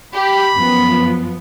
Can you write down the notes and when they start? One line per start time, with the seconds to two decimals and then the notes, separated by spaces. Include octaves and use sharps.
0.14 G4 B5
0.54 F#2 F3 B3